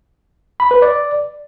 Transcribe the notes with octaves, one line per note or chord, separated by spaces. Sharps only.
B5
B4
D5